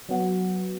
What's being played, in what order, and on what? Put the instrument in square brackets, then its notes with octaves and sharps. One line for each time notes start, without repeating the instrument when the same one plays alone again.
[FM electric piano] F#3 B3 F#4